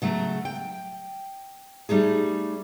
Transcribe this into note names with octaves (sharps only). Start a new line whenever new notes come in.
C#3 F#3 A3
G5
G3 A3 D#4 G#4